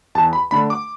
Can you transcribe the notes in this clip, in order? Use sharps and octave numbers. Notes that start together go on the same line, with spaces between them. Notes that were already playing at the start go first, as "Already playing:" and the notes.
E2 A5
B5
D3 A3 D4 B5
D6